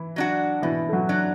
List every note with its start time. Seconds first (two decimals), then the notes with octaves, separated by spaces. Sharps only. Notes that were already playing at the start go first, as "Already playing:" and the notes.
Already playing: E3 E4
0.16 F#3 D4 F#4
0.62 B2 E3 E4
0.89 A4
0.93 F#3 F#4
1.09 F#3 D4 F#4